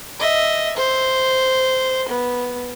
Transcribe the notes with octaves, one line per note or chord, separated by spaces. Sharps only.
D#5 E5
C5
B3